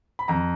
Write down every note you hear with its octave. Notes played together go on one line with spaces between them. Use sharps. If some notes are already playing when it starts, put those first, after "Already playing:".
B5
F2 A#5